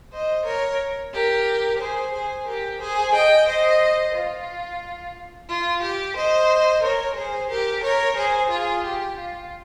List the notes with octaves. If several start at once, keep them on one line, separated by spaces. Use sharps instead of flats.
C5 D#5
A#4 C#5
G4 A#4
G#4 C5
G#4 C5
G4 A#4
G#4 C5
D#5 G5
C5 D#5
F4
F4
G4
C5 D#5
A#4 C#5
G#4 C5
G4 A#4
A#4 C#5
G#4 C5
F4 G#4
G4
F4